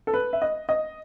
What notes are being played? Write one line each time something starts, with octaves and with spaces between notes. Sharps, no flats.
A4
B4
E5
D#5
D#5